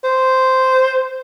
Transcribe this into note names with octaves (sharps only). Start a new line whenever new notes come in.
C5